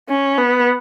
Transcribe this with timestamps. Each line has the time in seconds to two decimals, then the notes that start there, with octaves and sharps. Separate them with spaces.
0.09 C#4
0.37 B3